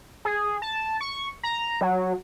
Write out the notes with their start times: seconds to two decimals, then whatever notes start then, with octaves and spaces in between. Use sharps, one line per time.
0.25 G#4
0.62 A5
1.01 C#6
1.43 A#5
1.81 F#3